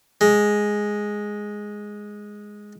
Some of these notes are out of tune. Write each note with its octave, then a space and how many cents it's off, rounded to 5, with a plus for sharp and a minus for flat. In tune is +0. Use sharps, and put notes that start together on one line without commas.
G#3 +0